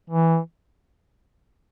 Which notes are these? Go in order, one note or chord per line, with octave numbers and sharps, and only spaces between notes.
E3